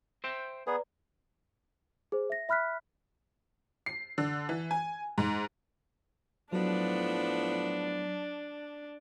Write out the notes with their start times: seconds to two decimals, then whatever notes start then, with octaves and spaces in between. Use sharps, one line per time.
0.24 C5 E5 G5
0.67 B3 G#4 B4 D5 A#5
2.12 G#4 C5
2.30 E5 A#6
2.49 E5 B5 F6 F#6 B6
3.86 C7
4.18 D3
4.49 E3
4.71 G#5
5.18 G#2
6.53 A2 F3 F#3 B3 D4